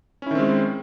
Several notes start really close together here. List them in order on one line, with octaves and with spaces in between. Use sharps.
C#4 E4 D#3 C4 G#3